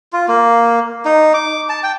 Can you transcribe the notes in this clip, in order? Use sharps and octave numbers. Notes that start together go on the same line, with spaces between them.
F4
A#3
D#4
D6
A5
G5